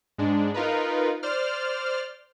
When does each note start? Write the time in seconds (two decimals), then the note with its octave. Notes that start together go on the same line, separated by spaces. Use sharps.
0.18 G#2 G#3 D4
0.54 D#4 F4 A#4 B4
1.23 C5 D5 F6